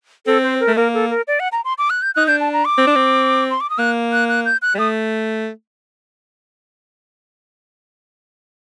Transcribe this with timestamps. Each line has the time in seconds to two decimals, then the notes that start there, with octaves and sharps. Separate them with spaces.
0.26 C4 A4
0.43 C5
0.60 A#4
0.67 A3
0.77 A#3 A#4
0.94 A4
1.10 A#4
1.28 D5
1.40 F#5
1.52 A#5
1.65 C6
1.78 D6
1.90 F#6
2.02 G6
2.15 D#4 F#6
2.27 D4 G6
2.40 A5
2.53 A#5
2.65 D6
2.78 C4
2.87 D4
2.95 C4
3.51 C6
3.61 D6
3.70 D#6
3.78 A#3 F#6
4.13 F#6
4.29 F#6
4.45 G6
4.62 F#6
4.74 G3
4.79 A3 D#6